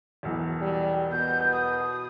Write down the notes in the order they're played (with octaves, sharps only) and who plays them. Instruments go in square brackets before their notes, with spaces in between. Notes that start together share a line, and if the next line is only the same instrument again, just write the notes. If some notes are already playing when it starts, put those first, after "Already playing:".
[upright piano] E1 B1 E3
[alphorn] G3
[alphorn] B2 [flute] G6
[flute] D#6